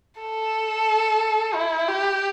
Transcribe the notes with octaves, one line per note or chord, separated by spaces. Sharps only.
A4
E4
G4